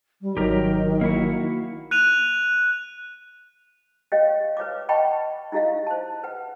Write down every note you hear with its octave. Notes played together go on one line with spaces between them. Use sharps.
G3
G#1 D#3 F#3 G4 A#4
A#3 E4 F#4
F#6 D#7 F7
G4 C#5 D#5 F5 G5
B4 C#5 F5 D6
D#5 F#5 G5 A5 B5 C#6
D#4 E4 G4 D#5 F5
C5 A5
B4 F#5